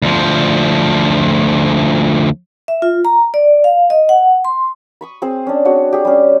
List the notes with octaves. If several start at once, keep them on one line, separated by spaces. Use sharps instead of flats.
D2 F3
E5
F4
A#5
D5
F5
D#5
F#5
C6
B5 C#6 D#6
C4 G#4 C5
C#4 D4
C4 D4 F#4 G#4
G4 G#4
G3 C#4